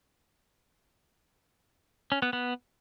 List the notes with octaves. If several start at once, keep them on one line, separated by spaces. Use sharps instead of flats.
C#4
B3
B3